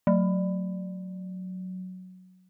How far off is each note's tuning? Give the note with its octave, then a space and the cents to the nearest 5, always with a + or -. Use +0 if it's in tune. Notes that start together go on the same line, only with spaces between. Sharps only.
F#3 -5